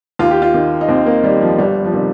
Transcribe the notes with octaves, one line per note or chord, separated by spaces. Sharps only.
D#2 F4
G4
F4
D#3
D#4
D#2 C4
A#3
D#3 G3
F3
G1 G3
F3
C3 D#3 G3